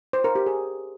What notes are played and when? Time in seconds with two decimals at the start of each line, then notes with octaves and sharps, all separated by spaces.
0.13 C5
0.24 A#4
0.35 G4
0.46 G#4